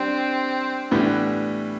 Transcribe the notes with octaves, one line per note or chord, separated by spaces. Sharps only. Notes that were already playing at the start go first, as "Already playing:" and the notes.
Already playing: G3 C4 D4
A2 E3 G3 B3 D4